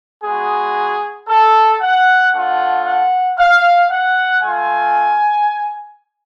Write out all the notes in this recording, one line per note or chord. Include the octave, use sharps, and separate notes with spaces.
G#3 B3 F#4 G#4
A4
F#5
A3 D4 F4 F#5
F#5
F5
F#5
A3 F4 G#5